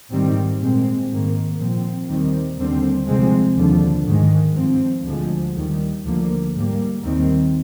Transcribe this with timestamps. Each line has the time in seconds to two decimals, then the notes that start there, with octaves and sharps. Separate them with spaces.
0.11 G#2 D#3 G3 C4
0.60 A#2 G#3 C4
1.10 G#2 D#3 A#3
1.59 A#2 F3 C4
2.09 D#2 D#3 G3 C4
2.58 D#2 D3 G3 C4
3.07 C2 C3 F3 G#3 C4
3.57 D#2 D3 F3
4.07 G#2 D#3 G#3
4.56 G2 F3 C4
5.05 D2 D3 F3 G#3
5.55 D#2 D#3 G3
6.04 D2 D3 F3 A#3
6.55 G#2 G3 A#3
7.03 D#2 D#3 G3 C4